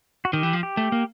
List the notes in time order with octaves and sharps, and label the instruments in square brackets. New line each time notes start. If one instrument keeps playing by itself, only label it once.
[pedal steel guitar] F#4
[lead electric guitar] D#3 [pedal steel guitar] G4
[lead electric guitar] E3
F3
[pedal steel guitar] G4
[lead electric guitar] A3
A#3